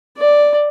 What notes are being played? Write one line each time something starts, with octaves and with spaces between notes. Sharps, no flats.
D5